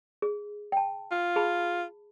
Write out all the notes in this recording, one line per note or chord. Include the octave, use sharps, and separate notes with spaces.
G#4
G5 A5
F4
G#4 A5 B5